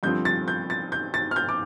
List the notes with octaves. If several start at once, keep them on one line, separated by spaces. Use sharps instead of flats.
G2 D3 F3 C4 G6
A6
G6
A6
G6
A6
F6
G6
D6